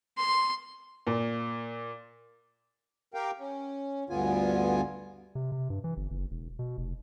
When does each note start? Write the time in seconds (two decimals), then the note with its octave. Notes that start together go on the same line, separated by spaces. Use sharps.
0.18 C6
1.07 A#2
3.14 G4 A#4 F5 G5
3.39 C#4
4.09 D2 G2 D3 B3 F4 G#5
5.35 C3
5.52 C3
5.70 G2
5.84 E3
5.97 G1
6.11 F#1
6.31 E1
6.59 B2
6.78 F1